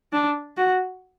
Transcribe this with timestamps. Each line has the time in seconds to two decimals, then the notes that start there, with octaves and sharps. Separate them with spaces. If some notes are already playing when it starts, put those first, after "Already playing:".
0.13 D4
0.57 F#4